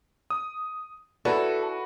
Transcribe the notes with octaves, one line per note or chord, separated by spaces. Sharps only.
D#6
E4 F#4 A4 B4 D5